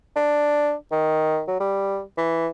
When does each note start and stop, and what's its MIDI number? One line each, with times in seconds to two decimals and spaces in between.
0.16 0.74 62
0.92 1.43 51
1.48 1.59 54
1.60 2.01 55
2.17 2.47 52